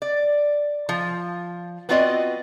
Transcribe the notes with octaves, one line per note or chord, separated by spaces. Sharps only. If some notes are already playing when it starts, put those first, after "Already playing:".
D5
F3
B3 C4 F4 F#4 D5 D#5